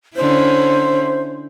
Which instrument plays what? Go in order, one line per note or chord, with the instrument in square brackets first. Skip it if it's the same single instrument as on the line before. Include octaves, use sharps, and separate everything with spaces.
[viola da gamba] D3 C#4 E4 [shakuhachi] C5